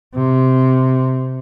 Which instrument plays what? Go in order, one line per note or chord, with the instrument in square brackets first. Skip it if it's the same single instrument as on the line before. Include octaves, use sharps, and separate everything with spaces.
[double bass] C3